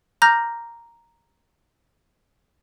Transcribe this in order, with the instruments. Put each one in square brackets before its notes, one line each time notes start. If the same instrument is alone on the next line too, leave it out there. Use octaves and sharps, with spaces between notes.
[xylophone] A#5 D6 F6 G6 A#6